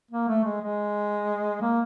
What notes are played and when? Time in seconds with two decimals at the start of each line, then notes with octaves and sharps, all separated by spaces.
0.11 A#3
0.28 A3
0.45 G#3
0.62 G#3
1.62 A#3